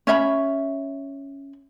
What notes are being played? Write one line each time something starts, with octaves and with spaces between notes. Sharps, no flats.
C#4 C#5 E5 B5